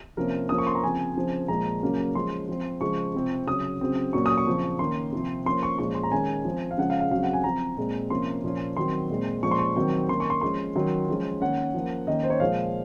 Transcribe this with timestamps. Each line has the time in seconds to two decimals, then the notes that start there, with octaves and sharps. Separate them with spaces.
0.17 C3 F3 A#3 C#4 A#4
0.49 F3 A#3 C#4 D#6
0.58 C#6
0.67 C6
0.75 A#5
0.83 C#3 F3 C4 G#5
1.16 C#3 F3 C4
1.48 A#2 F3 G#3 A#5
1.83 C#3 F#3 A#3 C#4
2.15 F3 G#3 C#4 C6
2.49 F3 C4
2.81 C#3 F3 G#3 C#6
3.14 C3 F3 C4
3.47 C#3 F#3 C#4 D#6
3.81 C#3 F#3 C4
4.13 A#2 F#3 A#3 C#4 C#6
4.26 D#6
4.37 C#6
4.47 C#3 F3 C4
4.79 D#3 A#3 C#4 C6
5.12 C3 F3 C4
5.46 F3 A#3 C#4 C6
5.63 C#6
5.78 A#2 F3 G#3 C#4 C#6
5.95 C6
6.03 A#5
6.12 D#3 G#3 C#4 G#5
6.45 F3 C4
6.71 F5
6.78 C#3 F3 G#3 C#4 F#5
6.90 F5
7.00 F5
7.11 C#3 F#3 C4 F5
7.23 F#5
7.33 G#5
7.44 F3 C4 A#5
7.77 A#2 G#3 C4
8.10 C3 F3 A#3 C#4 C6
8.43 A#2 F3 A#3 C#4
8.76 D#3 F#3 C4 C6
9.09 A#2 G#3 C4
9.42 A#2 F3 G#3 C#4 C#6
9.51 C6
9.59 C#6
9.76 D#3 F#3 C4
10.09 D#3 A#3 C#4 C6
10.20 C#6
10.30 C6
10.41 F3 G#3 C#4 C6
10.75 D#3 F#3 C#4
11.08 F3 G#3 C#4
11.41 D#3 A#3 C#4 F#5
11.74 F3 A#3 C#4
12.07 D#3 A#3 C#4 D#5
12.23 C5
12.30 C#5
12.40 A#2 F3 G#3 F5